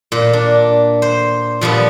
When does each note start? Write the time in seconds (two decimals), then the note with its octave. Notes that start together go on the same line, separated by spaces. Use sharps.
0.12 A#2
0.33 D4
1.02 C5
1.61 A#2 F3 G3 B3